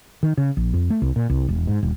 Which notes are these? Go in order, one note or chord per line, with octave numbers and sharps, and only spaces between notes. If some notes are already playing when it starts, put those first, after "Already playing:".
D#3
C#3
A#1
F2
A3
C2
A#2
C2
E1
G#2
D#1